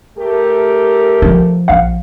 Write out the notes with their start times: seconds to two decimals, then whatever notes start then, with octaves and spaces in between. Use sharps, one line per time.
0.18 A3 G4 A#4
1.22 F3
1.68 A#1 F5 F#5